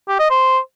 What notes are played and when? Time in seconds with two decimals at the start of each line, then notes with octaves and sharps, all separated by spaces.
0.08 G4
0.19 D#5
0.30 C5